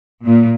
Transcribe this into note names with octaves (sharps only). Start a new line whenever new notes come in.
A#2